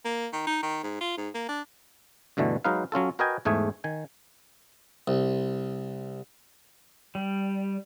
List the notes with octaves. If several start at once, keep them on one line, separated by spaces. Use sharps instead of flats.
A#3
D#3
D#4
D#3
G#2
F4
G#2
A#3
D4
G2 B2 D3 E3 A3
F#3 G#3 D#4 B4 F5
F#3 C#4 F4 A4
F#4 A#4 B4 D#5 G5 G#5
E2 G#2 A3 G#4 G#5
D#3 G#5
C2
G3